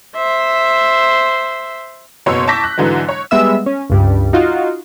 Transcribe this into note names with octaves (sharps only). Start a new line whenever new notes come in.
C5 E5
F#1 B2 C#5 C6 E6
A5 C#6 D6 G6 A#6 B6
F#6
G#2 D3 E3 F#3 G#3
C#5
G3 G#3 B3 E5 E6
C#4
C#2 G2 G3
D#4 F4 F#4